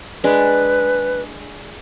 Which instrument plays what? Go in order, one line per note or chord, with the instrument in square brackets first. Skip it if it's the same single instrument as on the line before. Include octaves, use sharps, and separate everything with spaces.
[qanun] G#3 D4 [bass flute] B4